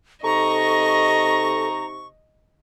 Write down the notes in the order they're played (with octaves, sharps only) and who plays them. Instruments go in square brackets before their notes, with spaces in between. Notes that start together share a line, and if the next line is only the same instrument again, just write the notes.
[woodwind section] C3 D#4 C#6 [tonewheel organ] A4 [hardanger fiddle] D#5 [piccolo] A#5